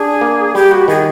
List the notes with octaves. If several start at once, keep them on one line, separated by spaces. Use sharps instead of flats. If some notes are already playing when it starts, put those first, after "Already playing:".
Already playing: D4 G#4
A#3
G3 G4
F#4
D#3 G#4